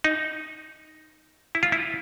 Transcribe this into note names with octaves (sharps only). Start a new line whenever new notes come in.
D#4
E4
F4
E4